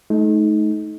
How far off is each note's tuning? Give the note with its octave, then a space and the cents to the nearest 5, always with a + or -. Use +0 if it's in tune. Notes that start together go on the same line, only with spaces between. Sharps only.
A3 -35 D#4 +15